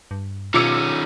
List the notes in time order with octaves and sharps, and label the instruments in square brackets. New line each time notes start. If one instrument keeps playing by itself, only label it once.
[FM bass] G2
[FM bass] B2 [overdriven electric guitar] D#3 C#4 [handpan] F4 [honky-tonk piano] D6 E6 C#7